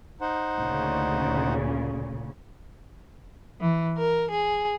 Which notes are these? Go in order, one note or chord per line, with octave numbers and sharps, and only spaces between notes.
D#4 C5 F#5
D2 A#2 C#3
E3
A#4
G#4